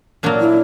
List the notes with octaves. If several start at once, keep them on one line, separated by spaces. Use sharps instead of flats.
A#2 F#3 A#3 D4
E4